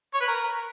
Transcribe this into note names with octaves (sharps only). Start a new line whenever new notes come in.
C#5
B4
A#4